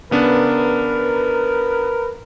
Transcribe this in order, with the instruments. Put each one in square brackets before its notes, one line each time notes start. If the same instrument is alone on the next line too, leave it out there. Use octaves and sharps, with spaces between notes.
[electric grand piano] C#3 B3 D4 [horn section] A#4 B4